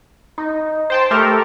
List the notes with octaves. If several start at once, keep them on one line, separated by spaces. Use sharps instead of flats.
D#4
C5 G5 A5
A3 G4 A4 A#4